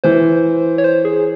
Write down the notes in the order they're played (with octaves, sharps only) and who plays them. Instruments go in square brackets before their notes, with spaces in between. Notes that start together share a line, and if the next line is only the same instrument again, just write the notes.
[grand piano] E3 [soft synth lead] C5
[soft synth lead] C#5
C5
G#4